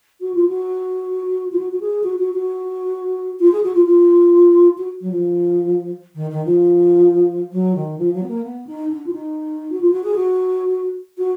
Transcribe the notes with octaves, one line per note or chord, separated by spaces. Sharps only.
F#4
F4
F#4
F4
F#4
F#4
G#4
F#4
F#4
F#4
F4
G#4
F#4
F4
F4
F#4
F#3
F3
D#3
D#3
F3
F#3
D#3
F3
F#3
B3
A#3
B3
D#4
D4
F4
D#4
F#4
F4
F#4
G#4
F#4
F#4